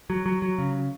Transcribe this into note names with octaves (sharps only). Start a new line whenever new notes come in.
F#3
F#3
F#3
C#3